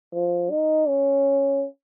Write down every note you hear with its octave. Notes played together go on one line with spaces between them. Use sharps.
F3
D#4
C#4